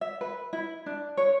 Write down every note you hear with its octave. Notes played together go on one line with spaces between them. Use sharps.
E5
B4
E4
D4
C#5